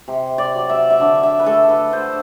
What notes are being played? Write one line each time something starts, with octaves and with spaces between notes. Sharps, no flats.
C3
D5
F#3
E5
E5
D3 D5
E5
B4
A3 A4
B4
D3 C5